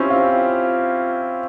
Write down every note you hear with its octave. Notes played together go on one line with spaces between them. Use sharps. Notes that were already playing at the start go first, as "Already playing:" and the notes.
Already playing: C4 C#4 E4 F4 G4
F4